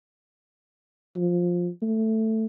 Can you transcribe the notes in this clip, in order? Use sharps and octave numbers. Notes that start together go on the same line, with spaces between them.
F3
A3